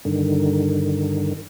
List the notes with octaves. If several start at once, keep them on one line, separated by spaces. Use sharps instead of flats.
G2 D3 D#3